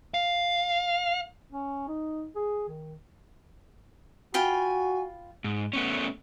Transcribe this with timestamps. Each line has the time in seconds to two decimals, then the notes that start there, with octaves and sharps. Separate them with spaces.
0.14 F5
1.52 C#4
1.88 D#4
2.35 G#4
2.68 D#3
4.34 F4 F#4 G5 G#5 B5
5.44 G#2
5.73 A3 B3 C#4